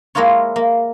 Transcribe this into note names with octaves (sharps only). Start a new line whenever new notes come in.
G#3 A#3 E4 F4 C#5
A#3